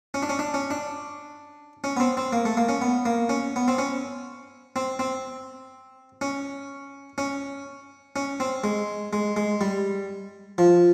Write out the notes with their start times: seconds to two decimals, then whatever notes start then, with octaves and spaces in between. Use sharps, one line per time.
0.14 C#4
0.22 D4
0.29 C#4
0.39 D4
0.54 C#4
0.71 D4
1.84 C#4
1.97 B3
2.00 C4
2.17 C4
2.33 A#3
2.45 A3
2.57 A#3
2.69 C#4
2.82 B3
3.06 A#3
3.29 C#4
3.56 B3
3.68 C4
3.78 C#4
4.76 C4
4.99 C4
6.21 C#4
7.18 C#4
8.16 C#4
8.40 C4
8.64 G#3
9.13 G#3
9.36 G#3
9.61 G3
10.58 F3